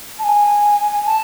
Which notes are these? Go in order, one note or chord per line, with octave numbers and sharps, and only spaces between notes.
A5
G#5
A5